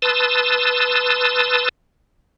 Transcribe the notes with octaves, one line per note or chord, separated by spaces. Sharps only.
B4 A5 C6 D#6 E6 A6